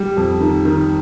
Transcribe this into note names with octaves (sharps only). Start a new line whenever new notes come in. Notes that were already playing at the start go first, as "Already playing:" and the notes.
Already playing: G3
F2
D#3
D#3